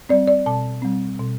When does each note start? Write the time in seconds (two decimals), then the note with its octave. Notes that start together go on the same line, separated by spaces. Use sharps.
0.09 G3 C4 D5
0.28 D5
0.46 B2 A5
0.82 G3 C4
1.19 B2